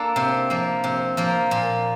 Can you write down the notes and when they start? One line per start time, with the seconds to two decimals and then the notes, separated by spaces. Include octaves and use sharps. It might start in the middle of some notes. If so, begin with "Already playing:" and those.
Already playing: A#3 D4 A4
0.16 C3
0.50 F3 A#3
0.84 C3
1.17 F3 A#3
1.51 A#2